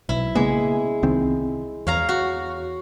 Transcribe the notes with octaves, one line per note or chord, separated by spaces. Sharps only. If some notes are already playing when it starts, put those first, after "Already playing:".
B1 E4
C#3 G#3 A#3 B3
C2 D#3 C4
E2 C#5 F5 A#5
F#4